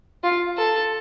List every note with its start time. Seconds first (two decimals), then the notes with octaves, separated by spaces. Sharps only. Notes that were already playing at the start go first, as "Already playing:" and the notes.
0.23 F4
0.57 A4